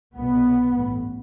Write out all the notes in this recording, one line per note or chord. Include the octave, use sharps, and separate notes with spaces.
C2 B2 B3
A1 A2